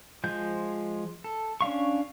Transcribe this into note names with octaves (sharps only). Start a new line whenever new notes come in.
F3 G#3 G6
A4
C#4 D4 F5 C#6